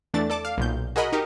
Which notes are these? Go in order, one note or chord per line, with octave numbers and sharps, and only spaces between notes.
E2 A3 D4 A6
A4 D5 A5 D6
F5
B1 A#2 G6
F#4 G#4 A#4 D#5 B5
D#4 G4 A#4